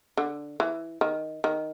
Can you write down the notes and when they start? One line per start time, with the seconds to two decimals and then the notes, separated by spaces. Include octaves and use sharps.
0.17 D3
0.60 E3
1.01 D#3
1.44 D#3